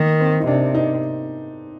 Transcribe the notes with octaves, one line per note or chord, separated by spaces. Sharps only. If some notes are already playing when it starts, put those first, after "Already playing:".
Already playing: D#3 A#3
C4
D#4
C3 D4
D#4